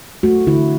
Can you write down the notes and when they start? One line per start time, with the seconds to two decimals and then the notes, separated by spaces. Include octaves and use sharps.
0.23 A3 F#4
0.47 D3 E4